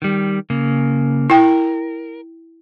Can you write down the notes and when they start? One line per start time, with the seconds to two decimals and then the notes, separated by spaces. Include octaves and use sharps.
0.02 D#3 G3
0.50 C#3 A#3
1.30 E4 A#4 G5